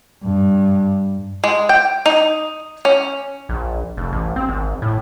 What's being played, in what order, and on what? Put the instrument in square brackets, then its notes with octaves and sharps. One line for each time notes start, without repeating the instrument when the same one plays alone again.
[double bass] G2
[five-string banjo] G#3
G5
D#4
C#4
[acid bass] A#1
F1
A1
C4
G#1
A2